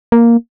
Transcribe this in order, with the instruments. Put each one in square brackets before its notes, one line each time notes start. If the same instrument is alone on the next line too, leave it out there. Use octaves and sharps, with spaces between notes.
[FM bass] A#3